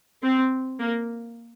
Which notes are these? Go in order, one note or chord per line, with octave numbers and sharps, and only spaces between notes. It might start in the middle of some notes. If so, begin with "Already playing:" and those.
C4
A#3